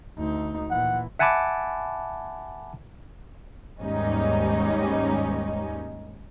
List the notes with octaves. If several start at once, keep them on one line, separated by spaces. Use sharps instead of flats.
D2 D#4
A#2 E3 F#5
E5 F#5 G#5 A5 B5 D6
D#2 G#2 G3 C#4 D#4